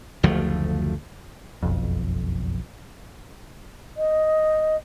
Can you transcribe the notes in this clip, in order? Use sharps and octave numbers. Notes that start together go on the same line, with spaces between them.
F#1 D2 F3 A3
F#1 B1 F2
D#5